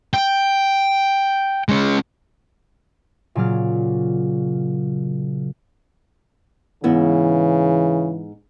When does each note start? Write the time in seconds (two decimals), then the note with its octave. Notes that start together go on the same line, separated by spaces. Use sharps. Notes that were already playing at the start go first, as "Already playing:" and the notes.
0.14 G5
1.69 G#3 C#4
3.35 A#2 C#3 F#3 D5 F6
6.84 G#2 C#3 E3 B3 E4